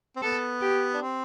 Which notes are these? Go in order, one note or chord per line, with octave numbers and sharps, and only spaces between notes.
C4
B3 A4
G4
D4
C4